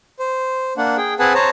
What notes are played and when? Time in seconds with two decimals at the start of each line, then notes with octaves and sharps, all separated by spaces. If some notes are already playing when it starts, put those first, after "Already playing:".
0.19 C5
0.77 A#3 D4 F#5
0.97 G#4 G5
1.19 C4 G#4 B4 F#5 G#5 A5
1.35 C5 C#5 A5 A#5